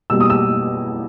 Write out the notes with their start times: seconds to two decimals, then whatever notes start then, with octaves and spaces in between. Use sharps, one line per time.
0.10 B2 G3 A#3 E6
0.20 D#6
0.30 E6